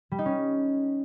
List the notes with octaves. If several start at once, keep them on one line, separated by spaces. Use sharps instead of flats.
G3
D#4
C#4